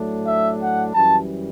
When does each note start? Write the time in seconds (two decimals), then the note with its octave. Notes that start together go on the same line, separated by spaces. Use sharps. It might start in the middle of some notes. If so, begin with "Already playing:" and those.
Already playing: A2 F#3 A3 D4
0.27 E5
0.60 F#5
0.93 F#2 E3 G3 A5